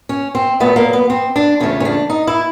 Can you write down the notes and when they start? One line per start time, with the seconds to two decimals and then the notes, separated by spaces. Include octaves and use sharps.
0.09 C#4
0.35 C4
0.60 A#2 F#3 A3 B3
0.76 A#3
0.93 B3
1.10 C4
1.36 D4
1.60 E2 C#3 F3 A3 C#4
1.80 C#4
1.85 D4
2.10 D#4
2.27 E4